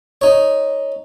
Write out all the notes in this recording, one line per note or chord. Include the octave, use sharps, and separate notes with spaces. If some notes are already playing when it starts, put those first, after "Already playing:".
D#4 C#5